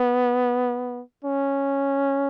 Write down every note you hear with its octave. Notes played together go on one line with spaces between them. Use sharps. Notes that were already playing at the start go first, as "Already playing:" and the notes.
Already playing: B3
C#4